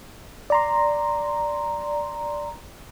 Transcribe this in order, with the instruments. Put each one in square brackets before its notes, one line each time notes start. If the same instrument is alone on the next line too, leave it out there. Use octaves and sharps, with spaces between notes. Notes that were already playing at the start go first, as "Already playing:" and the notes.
[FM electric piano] D5 A#5 C6